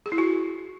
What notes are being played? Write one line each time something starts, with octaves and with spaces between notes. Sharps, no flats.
G#4
E4
F#4